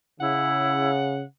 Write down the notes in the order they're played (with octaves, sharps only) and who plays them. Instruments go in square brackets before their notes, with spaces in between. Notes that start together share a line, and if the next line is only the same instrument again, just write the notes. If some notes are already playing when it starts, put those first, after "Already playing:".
[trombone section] C#3 [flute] E4 [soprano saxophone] F#5